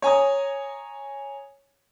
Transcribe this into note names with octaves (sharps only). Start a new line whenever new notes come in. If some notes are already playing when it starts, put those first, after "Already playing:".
C#5 G#5 A#5 D#6